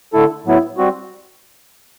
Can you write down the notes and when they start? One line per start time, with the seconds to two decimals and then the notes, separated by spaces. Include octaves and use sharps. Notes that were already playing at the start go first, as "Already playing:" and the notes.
0.13 D3 A3 E4 A4
0.45 A2 F#3 B3 E4
0.78 G3 C4 F#4